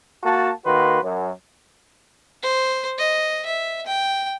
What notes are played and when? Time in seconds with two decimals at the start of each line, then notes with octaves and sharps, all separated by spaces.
0.24 A#3 F#4 A5
0.66 D#3 A#3 F#4 B4 C6
1.03 F#2
2.43 C5
2.98 D#5
3.46 E5
3.86 G5